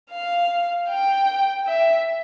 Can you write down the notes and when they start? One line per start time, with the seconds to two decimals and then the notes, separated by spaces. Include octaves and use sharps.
0.11 F5
0.89 G5
1.67 E5